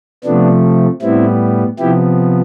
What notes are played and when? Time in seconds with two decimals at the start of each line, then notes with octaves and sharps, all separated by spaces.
0.24 C3 F3 A3 B3 D4
1.02 A2 G3 B3 C4 E4
1.79 C3 F3 B3 E4 G4